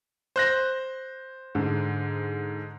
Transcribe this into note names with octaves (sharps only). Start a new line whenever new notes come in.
C5 F#6 A#6
G#2 D3